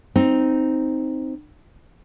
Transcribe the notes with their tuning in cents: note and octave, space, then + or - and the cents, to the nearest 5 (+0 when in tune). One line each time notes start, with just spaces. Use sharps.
C4 +0 D#4 +0